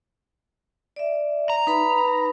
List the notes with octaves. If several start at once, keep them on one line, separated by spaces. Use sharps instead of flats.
D5 E5
A#5
D#4 B4 B5